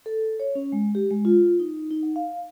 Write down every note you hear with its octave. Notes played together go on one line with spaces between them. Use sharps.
A4
C#5
C#4
G#3
G4
G#3
F4
D#4
D#4
F#5
F5